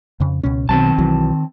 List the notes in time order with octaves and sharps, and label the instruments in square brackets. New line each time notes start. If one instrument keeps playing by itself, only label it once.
[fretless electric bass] F2 C#3
C#2 B2 C#4
[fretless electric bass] B1 B2 F#3 [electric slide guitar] D#3 C4 A5
[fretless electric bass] B1 E3 F#3